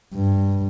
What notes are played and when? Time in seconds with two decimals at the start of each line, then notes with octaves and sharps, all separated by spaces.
0.15 G2